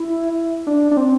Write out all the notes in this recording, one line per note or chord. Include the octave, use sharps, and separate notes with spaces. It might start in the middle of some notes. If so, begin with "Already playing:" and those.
Already playing: E4
D4
D4
C4